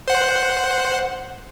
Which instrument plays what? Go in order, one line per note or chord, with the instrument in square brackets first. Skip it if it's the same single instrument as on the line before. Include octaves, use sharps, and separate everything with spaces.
[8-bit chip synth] C5 F#5